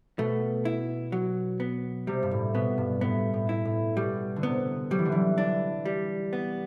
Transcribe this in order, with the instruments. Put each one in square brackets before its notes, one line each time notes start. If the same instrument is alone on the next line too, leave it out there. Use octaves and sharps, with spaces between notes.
[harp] B2 [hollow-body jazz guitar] A3
[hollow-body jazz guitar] E4
F#3
B3
[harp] C3 [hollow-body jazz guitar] G3
[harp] G2
A2
[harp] B2 [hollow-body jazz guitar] B3
[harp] G2
[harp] A2 [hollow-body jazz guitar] B3
[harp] A2
[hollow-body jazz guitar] E4
[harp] A2
[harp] B2 [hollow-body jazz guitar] G3
[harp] D3
[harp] C3 [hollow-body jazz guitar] B3
[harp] F#3 [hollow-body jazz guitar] G3
[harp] E3
D3
E3
[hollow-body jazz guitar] D4
G3
B3